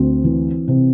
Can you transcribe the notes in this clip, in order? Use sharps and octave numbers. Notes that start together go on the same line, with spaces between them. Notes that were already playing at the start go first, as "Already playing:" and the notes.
Already playing: D2 C4
E3
C3